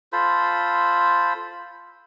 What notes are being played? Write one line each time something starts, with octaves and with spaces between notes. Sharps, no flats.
F4 A4 C5 B5